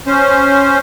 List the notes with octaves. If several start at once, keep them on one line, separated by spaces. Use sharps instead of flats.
C#4 C5